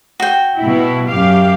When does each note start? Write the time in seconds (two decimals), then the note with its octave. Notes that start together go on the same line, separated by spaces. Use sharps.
0.20 F#4 G5
0.58 B2 E4
1.09 F#2 G4 F5